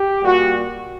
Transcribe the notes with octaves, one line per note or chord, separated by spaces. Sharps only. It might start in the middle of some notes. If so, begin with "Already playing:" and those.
Already playing: G4
A#2 G3 F#4